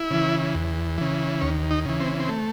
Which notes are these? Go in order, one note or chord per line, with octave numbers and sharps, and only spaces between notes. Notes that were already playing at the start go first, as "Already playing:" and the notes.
Already playing: E4
C#3 E3
E2
C#3 E3
D#2 C#4
D#4
C#3 E3
C4
C4
A3